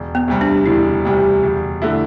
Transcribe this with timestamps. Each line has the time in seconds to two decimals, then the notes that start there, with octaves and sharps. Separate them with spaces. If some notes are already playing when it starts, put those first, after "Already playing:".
Already playing: E1
0.15 B3
0.28 D2 C3 G3
0.41 D4
0.66 E1 E4
1.05 D2 C3 G3
1.43 E1
1.82 D3 A3 E4